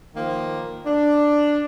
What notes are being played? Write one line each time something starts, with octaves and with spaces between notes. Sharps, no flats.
D#3 F3 A#3
D4